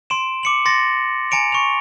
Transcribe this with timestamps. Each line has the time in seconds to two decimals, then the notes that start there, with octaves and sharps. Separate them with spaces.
0.10 C6 D7 E7
0.43 D6 C#7 F#7
0.65 C6 A6 A#6 C#7
1.31 G#5 A#5 C#7 D7 F7
1.52 C#6 F7